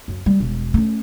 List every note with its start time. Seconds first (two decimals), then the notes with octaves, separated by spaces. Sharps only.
0.08 F#2
0.26 G3
0.40 E1
0.74 A3 C#4